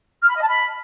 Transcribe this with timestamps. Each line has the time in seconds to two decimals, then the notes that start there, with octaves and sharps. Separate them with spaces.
0.22 F6
0.28 B5
0.35 D#5
0.41 A5
0.48 B5